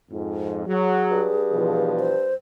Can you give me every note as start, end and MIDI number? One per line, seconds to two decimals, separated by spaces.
0.11 0.66 41
0.11 0.66 44
0.66 1.29 54
0.66 1.91 68
1.11 2.31 43
1.53 2.12 47
1.53 2.12 52
1.53 2.12 53
1.99 2.34 72